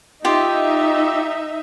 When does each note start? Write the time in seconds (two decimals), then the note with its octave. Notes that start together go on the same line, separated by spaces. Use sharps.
0.25 D#4 F4 G4 E5